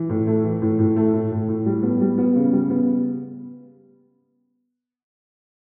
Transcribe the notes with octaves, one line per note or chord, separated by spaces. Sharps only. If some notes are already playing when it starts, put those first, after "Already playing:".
Already playing: E3
A2
A3
E3
A2
A2
A3
A2
A2
A2
G3
B3
G3
B3
C#3
G3
B3